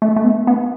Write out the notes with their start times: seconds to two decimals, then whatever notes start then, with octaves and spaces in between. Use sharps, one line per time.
0.02 A3
0.16 A3
0.24 B3
0.47 B3